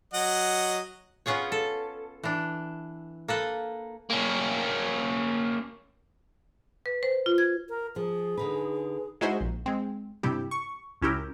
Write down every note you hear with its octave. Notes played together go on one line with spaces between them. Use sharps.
F#3 D#5 F#5
B3 C#4 F4 G#4 C#5
A4
E3 D4
A#3 A4 B4
A#3 C#4
B4
C5
F4
G#6
A#4
F3 G#4
D3 D#4 B4
G#3 D#4 E4 F#4 G#4 C5
A#1
G#3 C4
G2 C3 G3 E4 G4
C#6
C#2 C#4 E4 G4 A#4